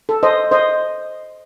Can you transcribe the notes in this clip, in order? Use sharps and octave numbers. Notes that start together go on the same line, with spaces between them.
A4
C5 D#5
C5 D#5